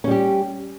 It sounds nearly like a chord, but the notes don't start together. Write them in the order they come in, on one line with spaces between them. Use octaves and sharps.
C#4 G3 G4